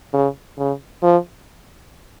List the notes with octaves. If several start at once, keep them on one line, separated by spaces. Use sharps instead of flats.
C#3
C#3
F3